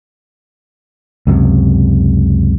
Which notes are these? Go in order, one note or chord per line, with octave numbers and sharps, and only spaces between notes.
C#2 F#2 C3